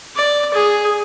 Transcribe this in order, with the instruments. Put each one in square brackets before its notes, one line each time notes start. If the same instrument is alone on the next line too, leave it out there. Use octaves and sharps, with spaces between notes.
[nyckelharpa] D5
G#4